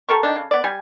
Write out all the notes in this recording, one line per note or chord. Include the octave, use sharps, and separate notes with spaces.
G4 A4 A#4 C#6
D#3 D4
C#3
B3 D5
G3 G#5